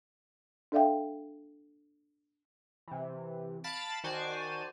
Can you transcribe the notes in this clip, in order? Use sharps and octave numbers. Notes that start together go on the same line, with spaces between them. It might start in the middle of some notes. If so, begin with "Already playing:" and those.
D4 A4 D5 E5 F5 G5
C3 E3
F5 A5 B5 A6 B6 D7
D#3 F#4 C5 D5 G#5 A5